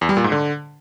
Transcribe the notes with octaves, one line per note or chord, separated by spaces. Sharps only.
E2
G3
A#2
G#2
D3